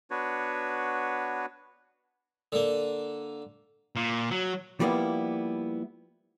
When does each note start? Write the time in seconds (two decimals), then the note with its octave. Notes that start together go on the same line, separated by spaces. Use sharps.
0.11 B3 D4 F#4 B4 C#5
2.52 D3 A#3
3.96 A#2
4.31 F#3
4.80 F3 G3 A#3 B3 E4